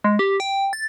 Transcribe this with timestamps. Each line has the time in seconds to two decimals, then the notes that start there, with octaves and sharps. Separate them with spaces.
0.04 G#3
0.19 G4
0.40 G5
0.73 A6